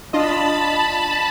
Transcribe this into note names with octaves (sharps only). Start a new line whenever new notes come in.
D4 F4 D#5 A5 B5